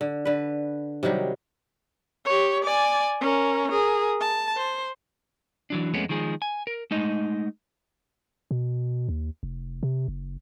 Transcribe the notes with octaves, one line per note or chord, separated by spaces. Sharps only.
D3
D3 B4
C3 D#3 F#3 G3
G4 C#5
D5 G#5
C#4 A#4
G#4 A#4
A5
C5
E3 F#3 D4
F2 G#3 A3 B3 C#4
D#3 F3 G#3 G#4
G#5
A#4
G#3 A3 D#4 D#5
B2
D#2
F1
C3
F#1